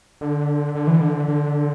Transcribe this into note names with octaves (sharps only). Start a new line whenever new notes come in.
D3
D3
E3
D3
D3